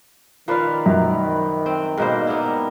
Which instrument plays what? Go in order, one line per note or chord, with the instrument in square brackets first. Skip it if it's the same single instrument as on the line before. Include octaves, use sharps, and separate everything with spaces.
[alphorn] D#3 [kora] F3 F5 [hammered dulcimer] A#4 B4 D5
[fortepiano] F#2
[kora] C4
[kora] G#2 B2 C5 [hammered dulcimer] G3 A#3 A#4
[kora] B3 E4